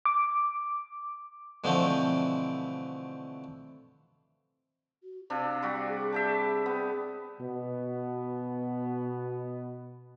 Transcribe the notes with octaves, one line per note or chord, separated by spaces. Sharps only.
D6
B2 D3 E3 F3 A3 C4
F#4
C3 D4 F5
G3 F#4
G#4
G#4 E5 G5 A5
B3
B2 B3